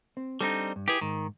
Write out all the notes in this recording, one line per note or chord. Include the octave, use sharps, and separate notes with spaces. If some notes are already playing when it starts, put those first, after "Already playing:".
C4
G3 C4 D4 D#4 A4
G2
E4 G4 G#4 B4
G#2 D#3